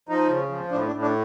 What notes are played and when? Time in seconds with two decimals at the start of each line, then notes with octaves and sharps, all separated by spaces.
0.09 F3 D#4
0.29 C#3
0.50 F3
0.71 A2 D4
0.87 D4
0.92 A2
1.02 D4